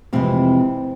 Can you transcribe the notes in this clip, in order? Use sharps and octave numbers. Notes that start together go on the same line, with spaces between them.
F2 C3 E3 G#3 A#3 C4